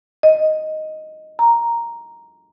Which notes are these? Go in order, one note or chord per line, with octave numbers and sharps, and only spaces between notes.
D#5
A#5